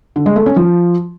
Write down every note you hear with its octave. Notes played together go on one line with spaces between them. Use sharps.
D3
G#3
A3
C#4
F3